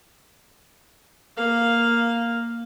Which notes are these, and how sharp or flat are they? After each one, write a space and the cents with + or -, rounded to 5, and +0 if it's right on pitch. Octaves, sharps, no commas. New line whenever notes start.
A#3 +0 F5 +0